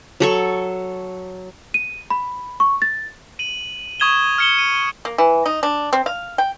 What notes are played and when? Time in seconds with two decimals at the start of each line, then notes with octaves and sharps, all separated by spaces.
0.20 F#3 A4 C#6
1.74 D#7
2.10 B5
2.60 C#6
2.82 A6
3.39 D#7 F#7
4.00 C#6 D#6 G#6 E7 G7
4.38 F6 G#6 C#7 E7 G7
4.58 D#7
5.05 A#3
5.18 E3
5.45 D#4
5.63 D4
5.93 C4
6.06 F5
6.38 G5